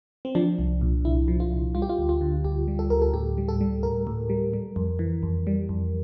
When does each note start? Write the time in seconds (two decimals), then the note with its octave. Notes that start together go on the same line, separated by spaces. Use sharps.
0.25 C4
0.35 F3 D4
0.59 C2
0.81 A#2
1.05 C2 E4
1.28 F3
1.40 F4
1.51 C2
1.75 G3 F4
1.82 G4
1.89 F4
1.98 D2
2.09 F4
2.21 D3
2.44 D2 G4
2.68 G3
2.79 A4
2.90 D2 A#4
3.02 A4
3.14 A2 G4
3.38 G3
3.49 A4
3.61 G3
3.83 A2 A#4
4.07 A2
4.30 G3
4.54 G3
4.76 F2
4.99 E3
5.23 F2
5.47 G3
5.69 F2